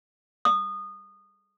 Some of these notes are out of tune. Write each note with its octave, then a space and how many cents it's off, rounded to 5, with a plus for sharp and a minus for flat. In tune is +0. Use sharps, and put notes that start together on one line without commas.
D#6 -20